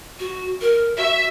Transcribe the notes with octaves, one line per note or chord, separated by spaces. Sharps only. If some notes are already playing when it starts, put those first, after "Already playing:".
F#4
A#4
F#4 E5